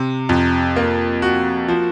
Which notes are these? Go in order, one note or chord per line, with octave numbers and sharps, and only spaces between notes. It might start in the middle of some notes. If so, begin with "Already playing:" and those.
Already playing: C3
F2
A#3
F#4
F3